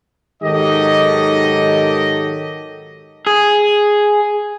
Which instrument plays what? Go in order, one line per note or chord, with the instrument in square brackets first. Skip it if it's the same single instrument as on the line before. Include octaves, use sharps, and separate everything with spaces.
[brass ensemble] G#2 D#3 F#3 G4 A4 D#5
[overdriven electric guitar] G#4